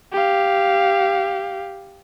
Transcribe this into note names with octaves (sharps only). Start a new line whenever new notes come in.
G4 F5